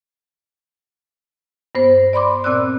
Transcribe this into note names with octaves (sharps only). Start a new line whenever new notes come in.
G2 B3 C5
D5 B5 C6 D6
A#2 C4 D5 E6 F#6